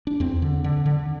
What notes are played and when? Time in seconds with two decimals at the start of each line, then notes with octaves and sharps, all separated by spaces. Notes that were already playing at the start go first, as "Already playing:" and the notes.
0.07 D4
0.20 E2 C4
0.42 D3
0.64 D3
0.86 D3